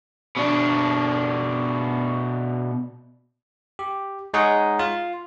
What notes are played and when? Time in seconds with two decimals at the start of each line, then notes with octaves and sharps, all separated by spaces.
0.37 B2 D4
3.79 G4
4.34 G#3 D#4 G#4 C#5 F#5
4.79 F4